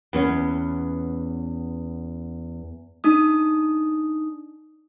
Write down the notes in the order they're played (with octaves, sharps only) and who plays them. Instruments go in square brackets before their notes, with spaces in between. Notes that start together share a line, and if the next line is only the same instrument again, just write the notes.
[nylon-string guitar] E2 B3 C#4
[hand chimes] D4 D#4 D#6